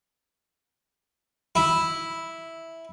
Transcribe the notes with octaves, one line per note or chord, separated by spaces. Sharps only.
E4